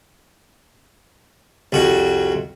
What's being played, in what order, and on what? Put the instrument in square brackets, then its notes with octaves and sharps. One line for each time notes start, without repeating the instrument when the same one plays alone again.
[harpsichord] C2 F2 F#4